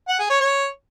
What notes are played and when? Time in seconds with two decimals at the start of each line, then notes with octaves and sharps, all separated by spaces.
0.08 F#5
0.19 G#4
0.30 C#5
0.40 C#5